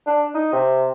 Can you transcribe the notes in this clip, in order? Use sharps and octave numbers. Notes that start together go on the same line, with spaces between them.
D4
D#4
C3